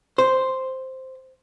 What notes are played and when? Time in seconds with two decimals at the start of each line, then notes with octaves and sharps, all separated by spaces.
0.18 C5